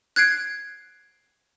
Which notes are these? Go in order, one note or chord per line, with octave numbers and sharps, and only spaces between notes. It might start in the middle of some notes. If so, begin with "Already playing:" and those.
F#6 G#6 C7 D7